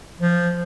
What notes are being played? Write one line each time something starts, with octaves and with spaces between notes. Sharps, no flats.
F3